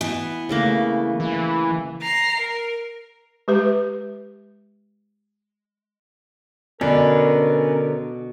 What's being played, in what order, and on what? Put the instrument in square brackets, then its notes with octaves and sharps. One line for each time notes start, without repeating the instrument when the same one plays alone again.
[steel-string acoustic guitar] E3 B3
[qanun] C#3 A3 A#3
[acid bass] E3
[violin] A#5 C7
A#4
[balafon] G#3 G4 B4
[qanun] B2 [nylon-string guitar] D3 [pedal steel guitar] C#4 D4 B4 [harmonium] A#4